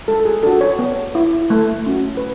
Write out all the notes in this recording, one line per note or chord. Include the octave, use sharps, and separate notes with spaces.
G#3 A4
A4
G#4
D4 F#4 A4
C#5
B3
E4
A3
C#4 F#4
B4